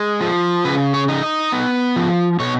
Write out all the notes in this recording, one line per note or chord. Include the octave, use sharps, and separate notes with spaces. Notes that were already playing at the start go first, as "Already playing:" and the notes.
Already playing: G#3
F3
C#3 B4
C#5
D#4
D#5
B3
F3
B2 C#5